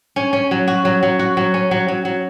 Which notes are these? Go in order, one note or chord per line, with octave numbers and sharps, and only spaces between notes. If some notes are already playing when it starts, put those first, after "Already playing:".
C#4
C#4
F#3
F#4
F#3
F#3
F#4
F#3
C#4
F#3
F#3
F#3